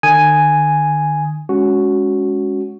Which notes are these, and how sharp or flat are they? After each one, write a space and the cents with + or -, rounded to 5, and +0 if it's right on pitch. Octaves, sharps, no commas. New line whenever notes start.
D#3 -45 G#5 +0 D#6 +0
G#3 +0 C#4 +15 F#4 +0